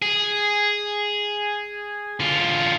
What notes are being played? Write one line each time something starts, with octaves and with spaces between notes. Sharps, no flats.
G#4
D3 F4